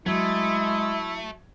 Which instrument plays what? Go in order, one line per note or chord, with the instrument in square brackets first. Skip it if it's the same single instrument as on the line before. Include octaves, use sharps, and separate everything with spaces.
[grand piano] F#3 G#6 [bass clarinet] G#3 [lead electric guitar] A3 [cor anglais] E4